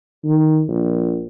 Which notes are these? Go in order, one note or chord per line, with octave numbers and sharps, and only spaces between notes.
D#3
A#1